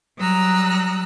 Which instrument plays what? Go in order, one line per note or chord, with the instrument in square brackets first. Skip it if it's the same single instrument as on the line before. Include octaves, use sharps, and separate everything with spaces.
[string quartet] F#3 G3 A#5 D#6 E6 F#6